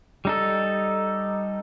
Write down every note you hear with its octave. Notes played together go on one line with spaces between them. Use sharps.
G3 D#4 A4